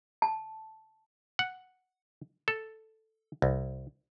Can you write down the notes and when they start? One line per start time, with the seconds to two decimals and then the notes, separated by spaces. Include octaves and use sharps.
0.22 A5
1.39 F#5
2.48 A4
3.42 C2